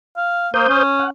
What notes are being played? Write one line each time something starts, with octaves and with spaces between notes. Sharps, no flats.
F5
A#3 C5 D#6 G6
C#4
F#5